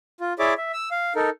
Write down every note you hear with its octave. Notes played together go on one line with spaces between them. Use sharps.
F4
E4 G#4 C#5 D5 E5 D6
E5
E6
F5
D#4 A4 A#4